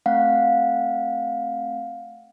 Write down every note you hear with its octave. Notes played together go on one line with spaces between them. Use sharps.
A3 C4 F5 F#5